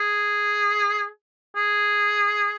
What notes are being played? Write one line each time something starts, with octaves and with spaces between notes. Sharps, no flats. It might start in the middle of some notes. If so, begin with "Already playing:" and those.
Already playing: G#4
G#4